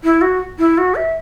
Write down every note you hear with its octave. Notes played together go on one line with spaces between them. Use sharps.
E4
F#4
E4
F#4
E5